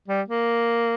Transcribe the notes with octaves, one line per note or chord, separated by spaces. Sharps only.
G3
A#3